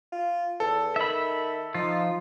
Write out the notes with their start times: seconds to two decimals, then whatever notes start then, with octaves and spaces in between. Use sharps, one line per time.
0.12 F4
0.60 E2 A4
0.96 D#3 E5 B5
1.74 F3 D#4 F4